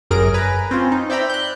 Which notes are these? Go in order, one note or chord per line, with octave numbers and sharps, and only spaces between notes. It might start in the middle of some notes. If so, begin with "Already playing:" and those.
G1 F#2 G#4 A#4 A#6 D7
B4 G#5 A#5
C4 C#4 F4
D#4
C5 D5 E5 G5 A#5 B5
F#6 G6